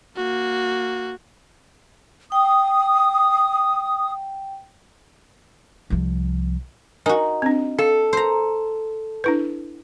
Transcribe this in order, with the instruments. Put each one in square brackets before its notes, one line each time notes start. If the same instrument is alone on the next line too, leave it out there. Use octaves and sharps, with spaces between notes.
[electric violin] A#3 F#4
[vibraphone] G5 [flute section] D#6
[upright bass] C2 F3
[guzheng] D#4 F#4 [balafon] A#4 G#5
[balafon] C4 D4
[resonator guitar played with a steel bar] A4 [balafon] F5
[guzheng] C5 A#5
[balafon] D4 E4 B4